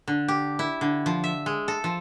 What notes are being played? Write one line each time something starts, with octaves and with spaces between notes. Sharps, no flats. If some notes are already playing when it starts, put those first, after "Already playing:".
D3
G4
E4
D3
F3
E5
G#3
A4
F3